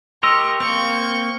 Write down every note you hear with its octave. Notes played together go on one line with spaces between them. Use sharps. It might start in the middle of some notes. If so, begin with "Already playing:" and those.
G4 A#4 D#5 C6 C#6 E6 A#6
A#3 C4 C#6 G6